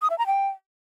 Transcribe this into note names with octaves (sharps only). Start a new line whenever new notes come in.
D#6
E5
A#5
G5